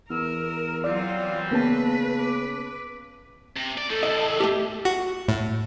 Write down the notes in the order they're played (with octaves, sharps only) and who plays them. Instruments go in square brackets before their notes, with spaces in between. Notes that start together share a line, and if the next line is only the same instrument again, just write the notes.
[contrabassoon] E2 [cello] A#4 [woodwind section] E6 F6
[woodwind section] E3 G3 C4 [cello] F#3 F4 [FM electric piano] D5
[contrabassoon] C#3 [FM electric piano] A#3 B3 A5 [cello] B4
[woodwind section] D6
[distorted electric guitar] C3
D5
[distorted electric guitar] A3 D#4 [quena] A4
[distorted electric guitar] E2 A2 [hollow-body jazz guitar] D#5
[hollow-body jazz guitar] A3 G4
[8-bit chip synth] F#4
A2